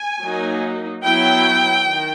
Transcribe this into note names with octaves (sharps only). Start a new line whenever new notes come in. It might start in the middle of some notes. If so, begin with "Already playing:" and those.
Already playing: G#5
F#3 A#3 D#4
F#3 B3 E4 G5
D#3